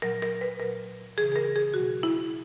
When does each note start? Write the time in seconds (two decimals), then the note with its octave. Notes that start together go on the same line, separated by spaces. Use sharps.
0.02 A#2 F#3 A#4
0.22 A#4
0.41 B4
0.60 A#2 F#3 A#4
1.17 C#3 E3 G#4
1.32 G#4
1.36 A#4
1.56 G#4
1.74 B2 F#3 F#4
2.03 E4